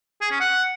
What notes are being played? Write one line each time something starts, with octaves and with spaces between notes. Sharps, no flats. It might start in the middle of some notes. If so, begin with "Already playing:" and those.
G#4
C#4
F#5